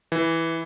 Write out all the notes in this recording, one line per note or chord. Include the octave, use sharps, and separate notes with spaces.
E3